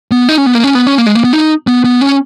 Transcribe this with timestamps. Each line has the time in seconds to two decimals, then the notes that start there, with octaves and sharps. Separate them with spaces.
0.11 B3
0.29 D#4
0.38 C#4
0.46 B3
0.55 A#3
0.64 C#4
0.75 B3
0.87 C#4
0.98 A#3
1.07 G#3
1.15 A#3
1.24 B3
1.33 D#4
1.67 B3
1.84 B3
2.01 C#4